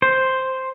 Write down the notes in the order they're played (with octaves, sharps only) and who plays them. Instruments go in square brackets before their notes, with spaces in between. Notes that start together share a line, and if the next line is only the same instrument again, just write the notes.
[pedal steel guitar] C5